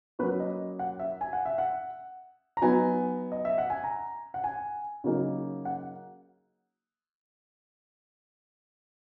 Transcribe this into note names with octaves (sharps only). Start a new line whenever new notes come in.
F#3 A#3 C#4 F#4 B4
D#5
F#5
E5
G#5
F#5
E5
F#5
A#5
F#3 B3 D#4 G#5
D#5
E5
F#5
G#5
A#5
F#5
G#5
C#3 F#3 A#3 D#4 G#4
F#5